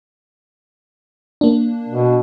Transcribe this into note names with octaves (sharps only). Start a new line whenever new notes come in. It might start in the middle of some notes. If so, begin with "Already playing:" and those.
A#3 D4
B2